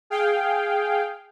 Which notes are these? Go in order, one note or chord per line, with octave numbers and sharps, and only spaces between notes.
G#4 F5 G5